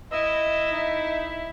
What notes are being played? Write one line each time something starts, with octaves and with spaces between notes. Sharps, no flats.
E4 D#5 E5 E6
D#4